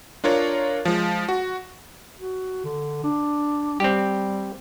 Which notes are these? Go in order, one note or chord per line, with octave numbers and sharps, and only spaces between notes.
D4 F4 A#4 C#5
F3 G#3
F#4
F#4
D3
D4
G3 C4 G4